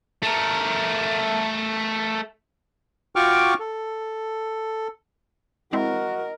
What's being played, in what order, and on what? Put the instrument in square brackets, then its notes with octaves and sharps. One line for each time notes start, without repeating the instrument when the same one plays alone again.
[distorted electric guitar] A3 A#4
[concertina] F4 F#4 G5 C#6 D6 F6
A4
[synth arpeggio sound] G#3 C4 E4 [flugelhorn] F#4 [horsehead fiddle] A#4 [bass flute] D#5